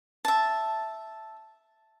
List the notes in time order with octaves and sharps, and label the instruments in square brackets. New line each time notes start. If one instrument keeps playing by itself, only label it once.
[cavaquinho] E5 A5